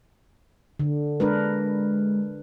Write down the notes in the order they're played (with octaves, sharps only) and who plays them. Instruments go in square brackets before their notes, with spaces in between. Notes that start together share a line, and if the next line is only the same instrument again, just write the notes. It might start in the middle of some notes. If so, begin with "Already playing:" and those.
[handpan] D3
[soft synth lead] G#3 [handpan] D4 A#4 B4